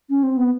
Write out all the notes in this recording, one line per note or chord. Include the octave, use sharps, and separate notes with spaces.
C#4
C4
B3